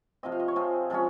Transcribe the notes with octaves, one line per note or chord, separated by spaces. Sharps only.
C3 F3 C4 D#5
F5
D#5
C#5
C3 F3 C4 G#4
C3 F3 G#3 C#4